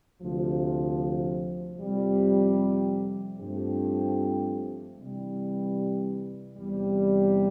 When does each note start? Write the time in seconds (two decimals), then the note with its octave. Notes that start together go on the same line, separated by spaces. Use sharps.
0.20 D2 C3 F3
1.79 F2 C3 G3
3.39 G2 F3 A3 C4 G4
4.98 C3 E3 G3
6.57 E2 C3 G3